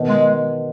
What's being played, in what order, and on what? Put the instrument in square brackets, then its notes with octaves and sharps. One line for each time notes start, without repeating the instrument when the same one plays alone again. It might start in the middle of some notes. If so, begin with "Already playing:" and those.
Already playing: [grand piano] B2 D#3
[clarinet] G#3